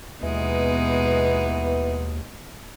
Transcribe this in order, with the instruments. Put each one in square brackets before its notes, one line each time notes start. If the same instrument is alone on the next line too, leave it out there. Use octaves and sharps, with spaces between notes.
[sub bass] D#2 [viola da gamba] B2 G#3 D#4 [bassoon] E3 [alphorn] B3